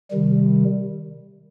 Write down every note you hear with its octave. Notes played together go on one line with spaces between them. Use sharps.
C3 D#3 G3